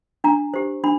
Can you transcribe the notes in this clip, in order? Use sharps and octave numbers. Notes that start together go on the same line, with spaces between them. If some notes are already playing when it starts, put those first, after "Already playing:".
D4 A#5
G4 C5
D4 B5